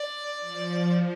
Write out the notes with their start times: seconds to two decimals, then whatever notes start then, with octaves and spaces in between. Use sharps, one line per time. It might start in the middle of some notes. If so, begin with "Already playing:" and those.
Already playing: D5
0.40 F3